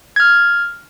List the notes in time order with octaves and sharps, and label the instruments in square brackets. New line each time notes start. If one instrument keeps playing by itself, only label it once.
[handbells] F6 G#6